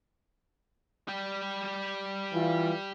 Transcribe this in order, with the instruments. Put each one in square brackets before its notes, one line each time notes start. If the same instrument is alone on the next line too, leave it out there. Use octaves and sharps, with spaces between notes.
[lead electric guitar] G3 G5
[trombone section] E3 F4